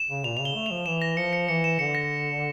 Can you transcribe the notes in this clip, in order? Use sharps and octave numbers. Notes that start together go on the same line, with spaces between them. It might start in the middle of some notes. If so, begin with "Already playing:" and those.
Already playing: E7
C#3
A#2 F7
C#3 F7
G7
A3
F3 F7
E3 E7
A#6
F3 C#7
C#7
E3 C#7
E7
D3 C#7
A#6